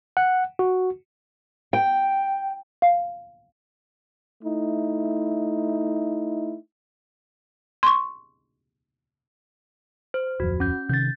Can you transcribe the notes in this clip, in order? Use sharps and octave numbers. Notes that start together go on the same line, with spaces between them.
F#5
F#4
G5
F5
A3 D#4 E4
C6 C#6
C5
D1 F2 F#4
C#4 G6
C3 D#3 G6 A6